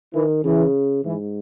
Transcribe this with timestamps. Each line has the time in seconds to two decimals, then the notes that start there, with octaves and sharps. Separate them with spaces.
0.14 D#3 E3
0.44 C#3 E3
1.05 G#2 E3